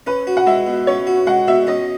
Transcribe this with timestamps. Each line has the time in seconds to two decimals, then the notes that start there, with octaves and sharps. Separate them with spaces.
0.07 C#4 B4
0.27 F#4
0.37 F#5
0.46 G#3 E5
0.67 B2
0.87 C#4 C#5
1.07 F#4
1.27 G#3 F#5
1.48 B2 E5
1.67 C#4 D#5